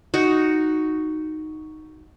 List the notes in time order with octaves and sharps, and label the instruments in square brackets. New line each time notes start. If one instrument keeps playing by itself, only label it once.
[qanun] D#4 F#4